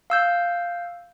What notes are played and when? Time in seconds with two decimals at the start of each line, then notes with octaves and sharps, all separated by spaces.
0.10 F5 E6 G6